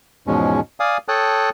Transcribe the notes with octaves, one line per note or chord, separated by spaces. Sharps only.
E2 G#2 B2 F3 G#3 C#4
D5 F5 G#5 D#6
A4 C#5 G5 A5 D#6 F#6